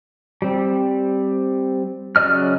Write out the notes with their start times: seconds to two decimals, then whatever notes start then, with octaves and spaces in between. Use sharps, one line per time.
0.42 G3 C4
2.16 C#3 F#3 D5 D#5 F6